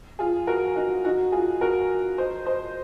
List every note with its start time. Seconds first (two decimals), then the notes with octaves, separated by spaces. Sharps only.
0.19 F4 G#4
0.47 F#4 A#4
0.75 D#4 F#4
1.04 D#4 F#4
1.32 F4 G#4
1.61 F#4 A#4
2.18 C5 D#5
2.46 C5 D#5